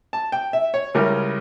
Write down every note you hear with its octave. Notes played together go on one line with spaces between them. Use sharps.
A5
G5
E5
C#5
C#2 C#3 G3 C#4 E4 A#4